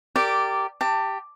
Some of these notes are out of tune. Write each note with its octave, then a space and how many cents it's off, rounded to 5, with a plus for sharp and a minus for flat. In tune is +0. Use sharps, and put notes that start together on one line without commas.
G4 -10 A#4 -30 D5 +0
G4 +0 A5 +25